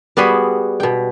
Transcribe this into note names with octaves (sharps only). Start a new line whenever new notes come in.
G3 B3 F#4 G#4 G#5 B5
B2 G5